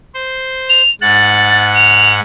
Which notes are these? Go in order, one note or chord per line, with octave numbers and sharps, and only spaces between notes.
C5
F7
G#2 F#5 F#6 A6
F7